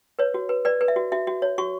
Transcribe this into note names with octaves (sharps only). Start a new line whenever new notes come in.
B4 C#5
F#4
B4
B4 D5
B4
E5
F#4
F#4 E5
F#4
C#5
F#4 C#6